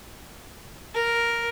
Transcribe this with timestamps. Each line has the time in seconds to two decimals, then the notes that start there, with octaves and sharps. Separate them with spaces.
0.94 A#4